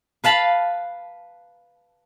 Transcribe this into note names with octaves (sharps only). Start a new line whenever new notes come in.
B4 F5 A5 B5